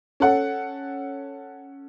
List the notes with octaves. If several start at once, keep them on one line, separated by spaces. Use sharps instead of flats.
C#4 A4 F#5